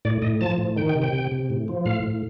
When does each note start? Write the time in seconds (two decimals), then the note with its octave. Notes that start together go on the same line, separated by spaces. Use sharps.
0.05 A2 D5
0.22 A2 D#5
0.41 F3 A5
0.58 A2
0.76 D#3 G5
0.89 G5
0.95 C3
1.02 G5
1.13 C3
1.31 C3
1.50 A2
1.68 F3
1.85 A2 F5
2.03 A2